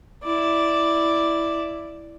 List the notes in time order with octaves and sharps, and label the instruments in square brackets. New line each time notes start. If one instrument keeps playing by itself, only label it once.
[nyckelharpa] E4 D5